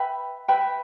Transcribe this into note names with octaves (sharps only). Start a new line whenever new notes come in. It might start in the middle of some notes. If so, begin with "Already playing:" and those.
Already playing: B4 E5 G5 B5
B4 E5 G5 B5